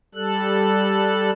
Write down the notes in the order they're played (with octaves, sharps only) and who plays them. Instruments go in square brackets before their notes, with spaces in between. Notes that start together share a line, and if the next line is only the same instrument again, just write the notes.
[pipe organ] G3 A4 F#6